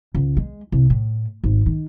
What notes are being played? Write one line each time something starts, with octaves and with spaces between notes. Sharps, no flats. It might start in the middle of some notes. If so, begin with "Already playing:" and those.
C#2
G#3
C2
A2
G#1
D#3